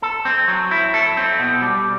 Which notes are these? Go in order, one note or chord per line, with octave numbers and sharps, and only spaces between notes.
A4
C4
F#3
E4
A4
C4
B2
G3